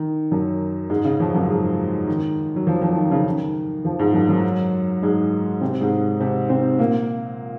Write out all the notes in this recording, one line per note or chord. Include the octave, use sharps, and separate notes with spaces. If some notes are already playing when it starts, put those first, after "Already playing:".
Already playing: D#3
F#2 F#3
G#2 G#3
C#3
F2 F3
F#2 F#3
G#2 G#3
D#3
F#3
F2 F3
F2 F3
D#3
C#3
D#3
F2 F3
G#2 G#3
F#2 F#3
F#2 F#3
G#2 G#3
C3 C4
G#2 G#3
C3 C4
C3 C4
A#2 A#3